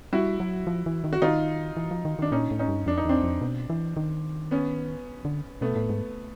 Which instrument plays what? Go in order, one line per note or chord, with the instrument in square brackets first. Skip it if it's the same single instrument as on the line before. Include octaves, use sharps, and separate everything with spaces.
[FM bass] G3 [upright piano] E4 F#4
[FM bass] F#3
F3
E3
D#3
[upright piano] F#4
[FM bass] D#3 [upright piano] D#4 F4
[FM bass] E3
F3
D#3
[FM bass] D#3 [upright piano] D4
[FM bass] A#2 [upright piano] C#4 D#4
[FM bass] A2
[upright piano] C#4 D#4
[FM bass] G2
[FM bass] F2 [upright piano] D4
[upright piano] D#4
[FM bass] E2 [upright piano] C4 D4
[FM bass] F2
B2
E3
D#3
[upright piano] B3 C#4
[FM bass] D3
[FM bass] B2 [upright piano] A3 B3
[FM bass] A2
G#2